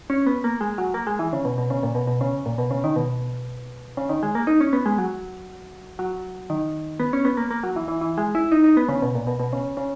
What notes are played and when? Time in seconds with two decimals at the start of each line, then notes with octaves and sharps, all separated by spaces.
0.10 C#4
0.26 B3
0.44 A#3
0.61 G#3
0.78 F#3
0.94 A#3
1.07 G#3
1.19 E3
1.33 C#3
1.45 B2
1.58 B2
1.70 C#3
1.83 A#2
1.95 B2
2.07 B2
2.21 C#3
2.46 A#2
2.58 B2
2.71 C#3
2.84 D#3
2.96 B2
3.97 C#3
4.09 D#3
4.23 G#3
4.35 A#3
4.47 D#4
4.61 C#4
4.73 B3
4.86 G#3
4.98 F#3
5.99 F#3
6.50 D#3
7.00 B3
7.13 C#4
7.25 B3
7.37 A#3
7.51 A#3
7.63 F#3
7.76 E3
7.88 E3
8.01 E3
8.18 G#3
8.35 E4
8.52 D#4
8.64 D#4
8.77 B3
8.89 C#3
9.02 B2
9.15 A#2
9.27 B2
9.40 B2
9.53 C#3
9.77 C#3